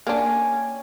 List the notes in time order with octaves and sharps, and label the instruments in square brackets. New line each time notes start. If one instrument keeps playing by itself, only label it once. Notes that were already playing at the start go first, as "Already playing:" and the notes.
[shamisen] A#3 D4 [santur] C#4 G5 G#5